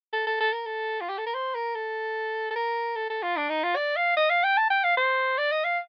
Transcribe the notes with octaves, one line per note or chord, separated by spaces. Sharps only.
A4
A4
A4
A#4
A4
F4
G4
A4
A#4
C5
A#4
A4
A4
A#4
A4
A4
F4
D4
D#4
F4
D5
F5
D#5
F5
G5
A5
G5
F5
C5
D5
D#5
F5